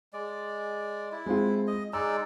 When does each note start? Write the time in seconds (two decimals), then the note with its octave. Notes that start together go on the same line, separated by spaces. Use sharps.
0.13 G#3 D5
1.12 E4
1.26 G#3 C4 F4
1.67 D#5
1.93 G#3 D#4 D5 E6